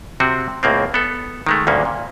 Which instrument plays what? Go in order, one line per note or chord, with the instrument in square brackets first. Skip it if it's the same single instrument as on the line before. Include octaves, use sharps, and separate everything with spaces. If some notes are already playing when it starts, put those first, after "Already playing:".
[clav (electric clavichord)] C3 C4 F#4
C#2 A2 A#3 C4
B3 A4
D#3 G#3 A3
D2 G2 A#2 A#3 C#4
A#2